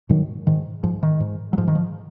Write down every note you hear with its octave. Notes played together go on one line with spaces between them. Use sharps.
G#2 D#3 F#3
G#2 D#3
G#2 F3
D#3
G#2
F#3
G#2 F3
D#3
F3